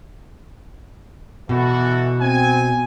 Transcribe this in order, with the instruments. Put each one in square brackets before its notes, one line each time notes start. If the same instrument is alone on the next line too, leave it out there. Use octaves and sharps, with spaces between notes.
[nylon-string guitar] B2 [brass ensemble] E3 F#4 A4
[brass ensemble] C4 G#5